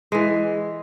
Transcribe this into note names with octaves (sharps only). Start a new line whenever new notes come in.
E3 G#3